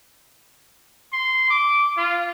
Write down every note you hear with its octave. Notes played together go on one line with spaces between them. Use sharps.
C6
D6
F4